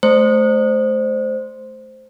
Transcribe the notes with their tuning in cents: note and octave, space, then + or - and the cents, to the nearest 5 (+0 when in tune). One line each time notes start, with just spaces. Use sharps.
A3 -25 C5 +0